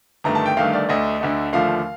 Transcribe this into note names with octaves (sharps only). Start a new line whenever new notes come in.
G1 G2 D#3 A3 A#5
A5
G5
G1 G2 D#3 A3 F5
D5
D2 D3 A3 D#5
D2 D3 A3
D#2 D3 F3 A3 F5